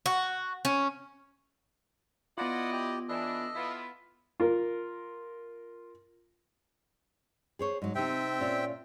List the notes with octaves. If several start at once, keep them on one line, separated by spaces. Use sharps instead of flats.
F#4
C#4
B3 E4 F4 D5 D#5 F#5
G4
E3 D4 A4 D#5
B3 E4 F4
F4 A#4
G#4 C5 C#5
G#2 F#3
C3 C4 D#4 E5 G5
A#2 C#4 F4